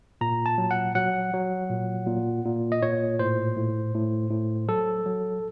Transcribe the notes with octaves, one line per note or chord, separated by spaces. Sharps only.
A#2 A#5
A5
F#3
F#5
F#3 F#5
F#3
A#2
A#2
A#2
D#5
A#2 C#5
A2 C5
A2
A2
A2
F#3 A4
F#3